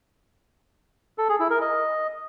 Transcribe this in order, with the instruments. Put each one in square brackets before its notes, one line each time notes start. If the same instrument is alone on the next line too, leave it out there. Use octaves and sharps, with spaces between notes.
[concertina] A4
G#4
E4
A#4
D#5